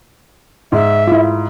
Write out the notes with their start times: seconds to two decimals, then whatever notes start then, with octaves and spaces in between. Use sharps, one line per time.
0.72 G#2 E5
1.08 E4 F4